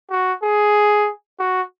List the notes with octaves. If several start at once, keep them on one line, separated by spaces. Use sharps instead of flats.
F#4
G#4
F#4